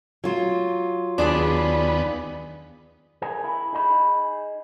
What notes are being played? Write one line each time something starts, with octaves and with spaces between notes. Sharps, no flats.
F#3 F4
D#2 B3 D4 G#4 D5
G#4 A#4 F#5 G#5
E4
D#4 G#4 D#5 B5